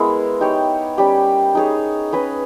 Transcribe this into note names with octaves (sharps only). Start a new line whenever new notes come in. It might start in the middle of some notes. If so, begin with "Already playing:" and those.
Already playing: G#3 B3 E4 A#4
D#4 G4 C#5
G3 C#4 G4
D#4 G#4 C#5
C#4 G#4 B4 D#5